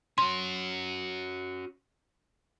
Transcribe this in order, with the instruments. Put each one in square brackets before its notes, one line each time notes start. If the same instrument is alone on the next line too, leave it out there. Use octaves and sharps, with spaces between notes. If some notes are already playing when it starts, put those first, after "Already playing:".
[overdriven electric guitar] C#4 F#4 [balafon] C6